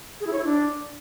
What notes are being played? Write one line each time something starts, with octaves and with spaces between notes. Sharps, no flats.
G#4
E4
C#5
E4
D4